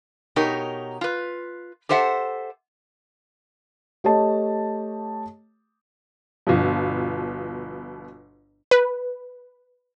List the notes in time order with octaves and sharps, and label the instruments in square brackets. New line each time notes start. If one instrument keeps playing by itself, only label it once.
[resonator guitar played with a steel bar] B2 D#4 G4 A#4 C#5
F4 B4
G4 A4 C5 E5 F#5
[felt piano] A3 G4 C#5 D#5 A5
[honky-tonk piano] G1 B2 F3
[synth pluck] B4